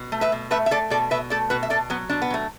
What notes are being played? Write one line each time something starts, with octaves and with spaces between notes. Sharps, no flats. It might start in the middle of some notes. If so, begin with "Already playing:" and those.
Already playing: B2
A3
B4 E5
B2
A3 B4 E5
E5
A3 A4 D5
B2 A4 D5
B2 B4 E5
A3 A4 D5
B2 F#4 B4
E5
B2 A4 D5
F#3 B3
B2 D4
B3
F#3 A3